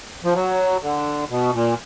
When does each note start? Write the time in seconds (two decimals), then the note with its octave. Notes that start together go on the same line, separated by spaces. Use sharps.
0.24 F3
0.35 F#3
0.82 D3
1.30 B2
1.53 A#2